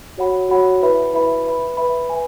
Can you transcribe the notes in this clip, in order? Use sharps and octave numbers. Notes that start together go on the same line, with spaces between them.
F#4 C#5 F#5 B5
F#4 C#5 F#5 B5
E4 B4 E5 B5
E4 B4 E5 B5
B4 E5 B5
B4 E5 B5
B4 G#5